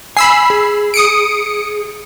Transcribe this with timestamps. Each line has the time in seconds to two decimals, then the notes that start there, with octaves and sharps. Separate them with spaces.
0.17 G#5 B5 E6 C7
0.50 G#4
0.94 D#6 C#7 D7